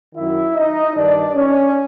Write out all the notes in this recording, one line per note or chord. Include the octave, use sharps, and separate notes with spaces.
F#2 D#3 E4 E5
D#4 D#5
G2 D#3 D4 D5
C#4 C#5